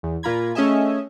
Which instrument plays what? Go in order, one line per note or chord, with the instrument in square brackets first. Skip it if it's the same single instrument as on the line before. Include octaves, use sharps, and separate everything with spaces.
[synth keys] E2
A#2 A#3 F4 A#5 B5 G#6
A3 C#4 G#4 D#5 E5 G#5